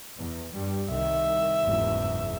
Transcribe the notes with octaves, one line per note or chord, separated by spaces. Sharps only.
E2
G2 G3
C2 D#3 E5
F#1 E2 G#2